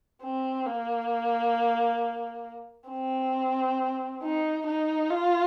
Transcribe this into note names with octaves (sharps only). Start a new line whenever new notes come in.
C4
A#3
C4
D#4
D#4
F4